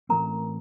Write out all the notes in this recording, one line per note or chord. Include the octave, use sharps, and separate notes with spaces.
A2 E3 A3 C4 A#4 A#5